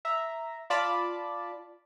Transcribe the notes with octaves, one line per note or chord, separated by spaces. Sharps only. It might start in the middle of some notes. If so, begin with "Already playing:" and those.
E5 A#5
F4 D5 A5 B5 D6